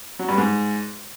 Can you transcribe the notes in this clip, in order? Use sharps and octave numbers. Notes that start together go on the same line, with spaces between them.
F#3
G2
G#2